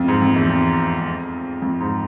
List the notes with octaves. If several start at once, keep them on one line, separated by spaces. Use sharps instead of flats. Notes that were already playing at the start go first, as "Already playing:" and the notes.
Already playing: F2
G#2
F2
E2
F2
F2
G#2